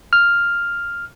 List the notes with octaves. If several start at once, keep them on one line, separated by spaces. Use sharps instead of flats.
F6